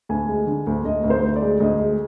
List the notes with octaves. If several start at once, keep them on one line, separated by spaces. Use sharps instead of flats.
D2 G#5
G#3
D3
D2
D2 D#5
D2
C5
D2
D5
G#3
D2 D#5
G#3